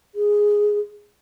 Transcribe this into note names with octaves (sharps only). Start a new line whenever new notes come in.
G#4